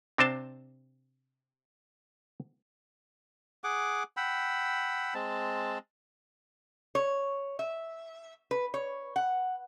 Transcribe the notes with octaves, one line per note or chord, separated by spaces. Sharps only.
C3 C4 D4 C5 A5
G#4 F#5 D6
F#5 G5 B5 E6
G#3 C4 A5
C#5
E5
B4
C#5
F#5